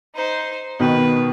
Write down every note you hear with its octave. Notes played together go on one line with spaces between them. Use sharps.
D#4 C5
B2 D#3 B4